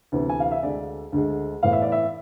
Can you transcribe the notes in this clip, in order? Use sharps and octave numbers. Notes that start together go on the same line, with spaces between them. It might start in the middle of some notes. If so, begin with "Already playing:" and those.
D2 C3 E3 B3
G#5
F5
E5
D2 D3 G#3 D5
D2 D3 G#3
A2 E3 B3 F5
E5
D5
E5